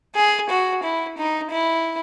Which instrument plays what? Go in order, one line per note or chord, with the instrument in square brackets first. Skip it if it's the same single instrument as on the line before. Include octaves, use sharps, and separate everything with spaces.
[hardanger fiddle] G#4
F#4
E4
D#4
E4